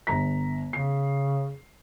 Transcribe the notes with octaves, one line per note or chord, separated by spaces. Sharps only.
G1 A#5 B6
C#3 C7